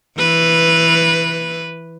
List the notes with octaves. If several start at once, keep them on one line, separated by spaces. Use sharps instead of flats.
E3 B4